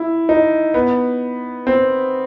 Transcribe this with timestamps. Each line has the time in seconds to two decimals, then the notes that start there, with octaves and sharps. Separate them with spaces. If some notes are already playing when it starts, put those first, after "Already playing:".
Already playing: E4
0.29 D#4
0.74 B3
1.67 C4